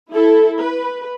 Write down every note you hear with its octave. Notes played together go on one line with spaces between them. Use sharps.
E4 A4
B4